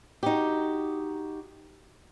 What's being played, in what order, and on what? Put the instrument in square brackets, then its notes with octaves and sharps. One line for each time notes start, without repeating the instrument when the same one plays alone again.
[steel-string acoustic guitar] D#4 F#4 G4